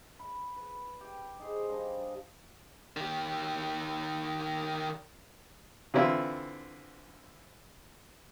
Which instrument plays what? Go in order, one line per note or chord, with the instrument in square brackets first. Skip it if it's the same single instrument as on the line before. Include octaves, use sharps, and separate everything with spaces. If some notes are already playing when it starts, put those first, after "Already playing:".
[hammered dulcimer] B5
B4
G4
D#4 G#4 C5
F3 G3 D4 D#5
[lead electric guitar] D#3 G4
[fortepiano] D3 E3 C4 E4 F4